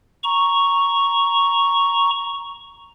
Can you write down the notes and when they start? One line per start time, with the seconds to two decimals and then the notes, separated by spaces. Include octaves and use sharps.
0.24 A#5 C#6